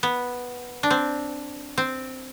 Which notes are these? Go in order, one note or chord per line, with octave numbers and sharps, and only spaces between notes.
B3
D4
C4
C4